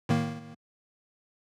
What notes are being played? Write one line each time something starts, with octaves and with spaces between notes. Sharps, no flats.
A2 D#3 A#3